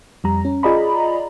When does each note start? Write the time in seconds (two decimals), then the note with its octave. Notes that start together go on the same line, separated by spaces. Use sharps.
0.24 F2 G3 A#5
0.45 C#4
0.63 F4 G#4 D5 D#5 A#5 B5